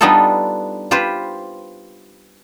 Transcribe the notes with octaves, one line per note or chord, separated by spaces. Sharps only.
G3 B3 D4 D#4 F4 A4
F4 G4 B4 C5